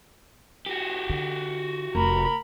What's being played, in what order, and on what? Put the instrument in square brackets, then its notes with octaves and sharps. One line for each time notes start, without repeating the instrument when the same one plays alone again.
[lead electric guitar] F#4 G4
[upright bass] D3
[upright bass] F1 [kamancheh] A#4 B5